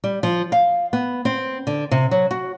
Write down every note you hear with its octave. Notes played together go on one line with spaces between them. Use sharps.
G3
F3
F5
B3
C4
D3
C3
F#3
F#4